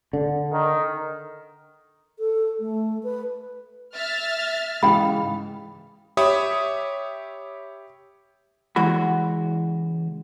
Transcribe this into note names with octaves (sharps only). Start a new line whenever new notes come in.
D3
D#3
A4
A3
B4
E5 F6 A6
G#2 C#3 E3 G#4 F5 G5 B5
G4 C#5 E5 B5 D#6
C#2 E3 G#3 F#4 B5